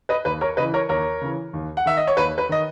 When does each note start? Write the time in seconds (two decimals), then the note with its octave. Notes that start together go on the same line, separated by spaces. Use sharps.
0.09 B4 D#5
0.25 D#2 B4
0.41 A#4 C#5
0.57 C#3 B4 D#5
0.62 E3
0.74 A#4 C#5
0.89 D#2 A#4 C#5
1.21 C#3 E3
1.53 D#2
1.77 F#5
1.86 D#3 E5
1.97 D#5
2.07 C#5
2.17 D#2 B4
2.38 B4
2.49 D#3 D#5